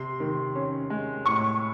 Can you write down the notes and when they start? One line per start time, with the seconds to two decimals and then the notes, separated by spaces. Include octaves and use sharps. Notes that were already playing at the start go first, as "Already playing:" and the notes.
Already playing: C3 C6
0.20 D#3
0.55 C#4
0.90 G#3
1.25 A2 C#6